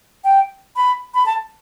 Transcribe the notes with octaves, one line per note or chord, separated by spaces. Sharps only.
G5
B5
B5
A5